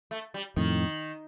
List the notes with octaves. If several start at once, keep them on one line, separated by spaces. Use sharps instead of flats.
A3
G3
F2 A2 D#3